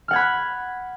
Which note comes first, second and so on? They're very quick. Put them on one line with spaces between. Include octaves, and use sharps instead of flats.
F6 F#5 G#6 B5 F#6